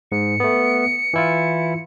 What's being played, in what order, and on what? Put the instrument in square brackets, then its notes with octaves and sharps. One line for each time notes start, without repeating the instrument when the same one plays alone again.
[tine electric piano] G#2 [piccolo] C#7
[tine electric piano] A3 B3
E3 E4 F4